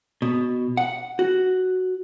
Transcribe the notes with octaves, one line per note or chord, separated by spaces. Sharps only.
B2
F#5
F#4